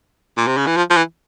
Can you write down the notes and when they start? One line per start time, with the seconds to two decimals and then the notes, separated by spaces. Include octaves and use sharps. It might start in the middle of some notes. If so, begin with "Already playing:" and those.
0.37 A#2
0.47 C3
0.57 C#3
0.67 E3
0.77 F3
0.90 F3
0.96 E3